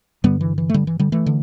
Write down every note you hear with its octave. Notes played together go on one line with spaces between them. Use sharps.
G2 D3 G3 B3
E3
E3
A3
D3 G3
E3
D3 G3
E3 A3
D3